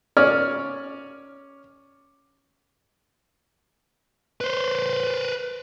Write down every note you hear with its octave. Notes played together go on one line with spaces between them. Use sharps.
C#4 C#5 D5 F6
B4 C5